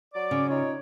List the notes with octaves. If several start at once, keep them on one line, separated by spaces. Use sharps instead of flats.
F#3 D5 D6
C#3
D#4 F4 C#5